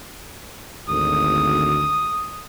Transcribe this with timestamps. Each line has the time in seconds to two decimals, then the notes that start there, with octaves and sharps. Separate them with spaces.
0.89 G#1 D2 D#6